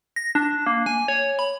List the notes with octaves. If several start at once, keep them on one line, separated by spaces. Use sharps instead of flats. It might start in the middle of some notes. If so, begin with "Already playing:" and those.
A#6
D4
A#3
G#5
C#5
B5